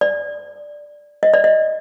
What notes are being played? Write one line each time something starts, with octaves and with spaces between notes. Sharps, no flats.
D5
D#5
D5
D#5